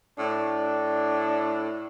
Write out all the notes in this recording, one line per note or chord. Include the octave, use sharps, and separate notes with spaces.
A2 D4